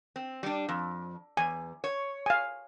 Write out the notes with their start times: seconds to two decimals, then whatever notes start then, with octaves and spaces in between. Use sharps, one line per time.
0.16 C4
0.43 G3 D4
0.69 F2
1.37 E2 G#5
1.84 C#5
2.26 F5 G#5